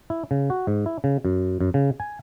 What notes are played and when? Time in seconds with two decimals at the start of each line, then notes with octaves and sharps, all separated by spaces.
0.10 E4
0.31 C#3
0.50 F#4
0.67 G#2
0.86 E4
1.04 C#3
1.25 F#2
1.61 F#2
1.74 C#3
2.00 G#5